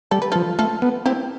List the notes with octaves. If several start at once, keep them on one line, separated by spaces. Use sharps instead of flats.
G3 A4
B4
F3 F4 A4
A3 F4 A4
B3
C4 E4 G4